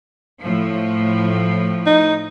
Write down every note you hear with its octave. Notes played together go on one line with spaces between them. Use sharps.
A2 F3
D#4